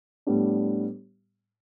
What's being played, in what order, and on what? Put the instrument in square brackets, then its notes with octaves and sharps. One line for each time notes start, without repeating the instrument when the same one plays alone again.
[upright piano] A2 G3 B3 D4